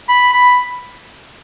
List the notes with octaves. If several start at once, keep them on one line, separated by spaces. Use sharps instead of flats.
B5
B5